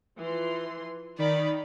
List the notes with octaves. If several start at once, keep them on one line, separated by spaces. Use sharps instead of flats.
E3 F3 C6
D#3 D#4 D5 B5